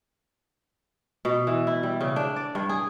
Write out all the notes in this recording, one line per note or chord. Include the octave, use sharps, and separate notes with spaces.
B2
E3
E4
G3
C#3
D4
D5
G2
G#4